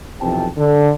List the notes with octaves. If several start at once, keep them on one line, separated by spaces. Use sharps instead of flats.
B1 F2 C3 E3 G5 A5
D3